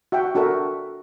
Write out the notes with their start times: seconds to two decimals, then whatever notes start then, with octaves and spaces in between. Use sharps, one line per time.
0.12 F#4 E5 F#5 G5
0.35 D4 F#4 A4 A#4 E5